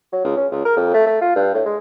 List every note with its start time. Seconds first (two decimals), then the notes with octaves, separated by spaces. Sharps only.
0.13 F#3
0.25 C#2
0.37 C#4
0.52 C#2
0.65 A#4
0.77 F2
0.94 A3
1.07 A3
1.21 F4
1.36 G2
1.54 A2
1.66 G#3